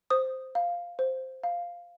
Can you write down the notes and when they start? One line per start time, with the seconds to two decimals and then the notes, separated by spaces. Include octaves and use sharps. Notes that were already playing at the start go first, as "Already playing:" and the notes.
0.10 C5 D#6
0.55 F5
0.99 C5
1.44 F5